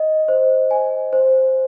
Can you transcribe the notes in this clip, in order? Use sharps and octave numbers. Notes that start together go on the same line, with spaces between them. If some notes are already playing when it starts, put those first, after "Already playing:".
Already playing: D#5
C5
G#5
C5